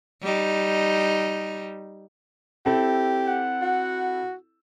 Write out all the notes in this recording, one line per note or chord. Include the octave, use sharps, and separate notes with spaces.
G3 D#4
C4 E4 G4 A4
F#5
F#4